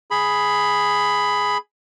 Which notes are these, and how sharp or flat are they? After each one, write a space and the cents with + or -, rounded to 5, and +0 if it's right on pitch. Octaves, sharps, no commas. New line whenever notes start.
G#4 +0 B5 +5